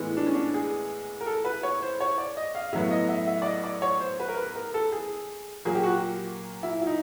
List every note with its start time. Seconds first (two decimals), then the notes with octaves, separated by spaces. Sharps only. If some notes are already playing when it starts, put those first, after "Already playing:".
Already playing: A2 E3 G#3 B3
0.17 D4
0.27 C#4
0.34 D4
0.54 G#4
1.21 A#4
1.27 A4
1.45 B4
1.63 C#5
1.82 C5
2.00 C#5
2.18 D5
2.37 D#5
2.55 F5
2.73 A2 F#3 B3 E5
2.91 D#5
3.09 E5
3.27 E5
3.42 D5
3.46 D#5
3.64 D5
3.82 C#5
4.00 C5
4.20 B4
4.29 A#4
4.37 B4
4.56 A#4
4.74 A4
4.92 G#4
5.65 A#2 F#3 A#3 G#4
5.75 G4
5.83 F#4
5.93 G4
6.63 E4
6.82 E4
6.87 D#4